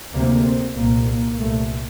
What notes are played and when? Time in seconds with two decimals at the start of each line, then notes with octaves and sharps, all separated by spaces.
0.12 D2 C3 A#3
0.44 C4
0.76 C2 A#2 A#3
1.07 A#3
1.38 C2 A#2 A3